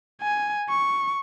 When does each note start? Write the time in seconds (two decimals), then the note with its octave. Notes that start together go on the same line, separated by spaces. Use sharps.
0.21 G#5
0.69 C#6